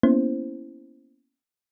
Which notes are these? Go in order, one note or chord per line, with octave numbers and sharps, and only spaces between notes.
A#3 B3 C#4 E4 C5